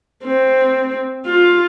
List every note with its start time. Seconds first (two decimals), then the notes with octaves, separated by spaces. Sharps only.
0.24 C4
1.26 F4